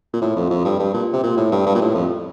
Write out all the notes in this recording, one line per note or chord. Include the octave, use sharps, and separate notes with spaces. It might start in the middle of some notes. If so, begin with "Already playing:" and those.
A#2
A2
F2
F2
G2
G2
A#2
C3
A#2
A2
G2
G2
A#2
A2
F2